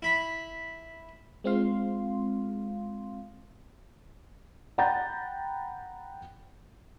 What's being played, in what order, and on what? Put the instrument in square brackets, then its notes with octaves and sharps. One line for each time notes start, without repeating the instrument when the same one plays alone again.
[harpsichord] E4 B5
[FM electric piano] G#3 C4 F4 F5 C6
[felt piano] F#5 G5 A#5 B5 G6 A6